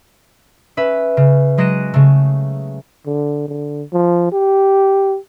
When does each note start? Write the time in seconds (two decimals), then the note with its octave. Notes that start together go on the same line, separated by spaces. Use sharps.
0.77 C#4 B4 E5
1.17 C#3
1.58 F#3 G#3 F#6 A#6 D#7 E7
1.94 C#3 A3
3.06 D3
3.48 D3
3.93 F3
4.32 G4